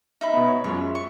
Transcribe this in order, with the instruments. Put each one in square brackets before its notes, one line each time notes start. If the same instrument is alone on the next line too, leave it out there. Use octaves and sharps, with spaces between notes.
[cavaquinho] D#4 E5 B5
[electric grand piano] B2 B3
C#5
[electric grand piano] F#2 G#3 F4 [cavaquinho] C#5
[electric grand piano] E5
[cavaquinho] C#6